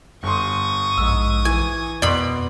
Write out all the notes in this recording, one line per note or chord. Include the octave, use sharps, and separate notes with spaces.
G1 C6 C#6 D#6
A#1 G#2 E6
E3 G#5
F2 B2 D5 B5 C6